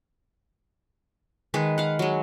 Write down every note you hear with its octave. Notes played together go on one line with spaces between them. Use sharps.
D#3 G#3 B4
F5 F#5
F#3 G#3